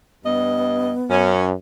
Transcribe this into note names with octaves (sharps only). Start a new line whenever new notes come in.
G2 B3 D#5
F#2 C#4